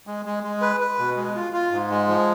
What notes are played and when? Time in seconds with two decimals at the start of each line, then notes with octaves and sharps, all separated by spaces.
0.07 G#3
0.25 G#3
0.43 G#3
0.61 B4
0.80 B4
0.99 B2
1.16 G#3
1.35 F4
1.53 F4
1.71 G#2
1.90 G#3
2.08 F3